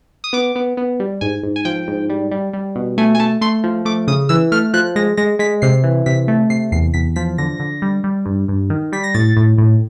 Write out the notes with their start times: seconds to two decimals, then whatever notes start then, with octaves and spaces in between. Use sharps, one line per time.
0.24 D#6
0.33 B3 D6
0.56 B3
0.77 B3
1.00 G3
1.21 G#2 G#5
1.43 G#2
1.56 G#5
1.65 F3 G5
1.88 G#2
2.10 G3
2.31 G3
2.53 G3
2.76 B2
2.98 A3 G#5
3.15 G#5
3.20 A3 A5
3.41 A3 C6
3.64 F3
3.85 A3 D6
4.07 C#3 D#6
4.29 E3 E6
4.52 A3 F6
4.74 F3 F#6
4.96 G#3 A#6
5.17 G#3 A#6
5.39 G#3 B6
5.62 C3 C7
5.84 E3
6.06 C3 B6
6.28 A3
6.50 C3 C7
6.72 E2 C7
6.94 E2 B6
7.16 F3 B6
7.38 D3 A#6
7.60 D3
7.82 G3
8.04 G3
8.26 G2
8.48 G2
8.70 D#3
8.92 G3 B6
9.04 A#6
9.14 A2 A6
9.37 A2
9.58 A2